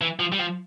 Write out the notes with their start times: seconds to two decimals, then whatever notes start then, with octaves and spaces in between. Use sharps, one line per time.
0.01 E3
0.20 F3
0.32 G3
0.39 F3